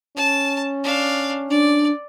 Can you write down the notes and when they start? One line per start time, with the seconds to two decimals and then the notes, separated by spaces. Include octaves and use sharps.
0.17 C#4 A5
0.84 D4 F5
1.50 D4 D5